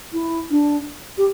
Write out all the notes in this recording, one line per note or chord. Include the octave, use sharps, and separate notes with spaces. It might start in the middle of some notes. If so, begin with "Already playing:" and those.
E4
D4
G4